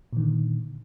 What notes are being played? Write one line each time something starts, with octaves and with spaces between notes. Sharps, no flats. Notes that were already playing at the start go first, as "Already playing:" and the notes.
A#2 D3 D#3